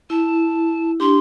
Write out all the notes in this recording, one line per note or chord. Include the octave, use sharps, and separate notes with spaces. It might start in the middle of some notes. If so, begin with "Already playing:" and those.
E4 A5
D4 G4 C6